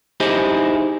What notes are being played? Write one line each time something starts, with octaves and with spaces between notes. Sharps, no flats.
D#4 E4 G4 G#4 C5 D#5